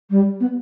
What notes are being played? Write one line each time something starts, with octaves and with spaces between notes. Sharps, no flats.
G3
B3